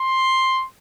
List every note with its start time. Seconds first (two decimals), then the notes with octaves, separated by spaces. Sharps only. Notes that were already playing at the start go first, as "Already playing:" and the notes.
Already playing: C6